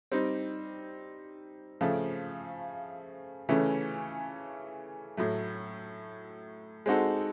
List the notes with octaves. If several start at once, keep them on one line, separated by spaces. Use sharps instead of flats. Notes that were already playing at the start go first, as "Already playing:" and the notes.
G3 C4 D#4
C#3 F3 A3
C#3 E3 A3 C#4
A2 F#3 A3
G#3 C4 D#4 F#4 A4